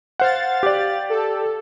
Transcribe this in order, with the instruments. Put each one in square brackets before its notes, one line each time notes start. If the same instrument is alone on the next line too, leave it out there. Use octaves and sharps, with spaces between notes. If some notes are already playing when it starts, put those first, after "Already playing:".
[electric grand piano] C5 F#5 [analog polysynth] F5 A6
[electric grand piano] G4 D5
[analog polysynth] A4